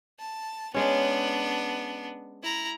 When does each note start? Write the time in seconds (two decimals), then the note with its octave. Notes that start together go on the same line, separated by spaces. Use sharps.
0.19 A5
0.74 G#3 B3 C#4 D4
2.43 E4 A#5